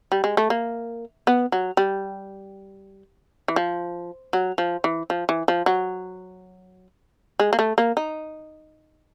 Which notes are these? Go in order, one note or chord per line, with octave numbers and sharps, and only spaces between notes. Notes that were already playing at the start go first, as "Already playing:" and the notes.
G3
G#3
A3
A#3
B3
F#3
G3
E3
F3
F#3
F3
E3
F3
E3
F3
F#3
G#3
A#3
A3
A#3
D#4